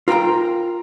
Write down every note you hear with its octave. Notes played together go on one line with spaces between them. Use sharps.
F4 A#4 G5 A5 A#5